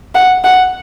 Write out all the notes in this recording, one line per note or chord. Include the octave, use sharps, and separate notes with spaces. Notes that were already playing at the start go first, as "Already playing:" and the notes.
F#5
F#5